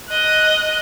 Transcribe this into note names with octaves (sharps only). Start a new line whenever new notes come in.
D#5 F#6